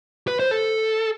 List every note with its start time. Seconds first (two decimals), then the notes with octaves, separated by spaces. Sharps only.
0.28 B4
0.40 C5
0.51 A4